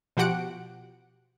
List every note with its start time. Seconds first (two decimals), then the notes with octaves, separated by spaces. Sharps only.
0.17 B2 F3 F#4 G4 F#5 D7